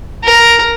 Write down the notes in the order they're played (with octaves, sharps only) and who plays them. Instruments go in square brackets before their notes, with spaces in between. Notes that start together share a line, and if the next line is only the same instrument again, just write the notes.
[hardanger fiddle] A#4